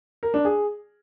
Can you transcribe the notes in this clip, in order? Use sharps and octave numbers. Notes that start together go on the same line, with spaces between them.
A#4
D4
G#4